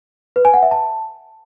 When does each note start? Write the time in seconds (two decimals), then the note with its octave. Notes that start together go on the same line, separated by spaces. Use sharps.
0.36 B4
0.45 G#5
0.54 F#5
0.62 E5
0.71 A5